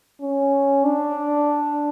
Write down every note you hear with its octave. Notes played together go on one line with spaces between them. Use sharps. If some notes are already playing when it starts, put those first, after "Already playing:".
C#4
D4